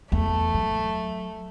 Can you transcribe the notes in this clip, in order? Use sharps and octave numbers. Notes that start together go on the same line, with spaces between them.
E2 A3
F#3